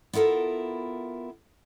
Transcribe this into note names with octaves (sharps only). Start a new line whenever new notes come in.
B3 E4 F4 A4 A#4